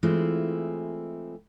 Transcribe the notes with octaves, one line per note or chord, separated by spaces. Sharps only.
E3 G#3 A3 C4 E4 F4